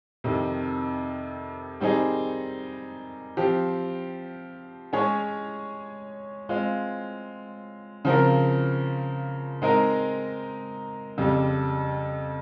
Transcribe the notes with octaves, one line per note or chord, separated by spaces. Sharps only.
F2 C3 D#3
D#3 G3 C4 D#4 G#4
F3 C4 G4
G#3 C#4 G#4 C#5
G#3 C4 F4
C#3 F3 C4 F4 A#4
G#3 C4 D#4 A#4
F2 C#3 G3